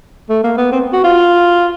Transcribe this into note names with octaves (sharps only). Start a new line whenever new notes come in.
A3
A#3
B3
C4
F#4
F4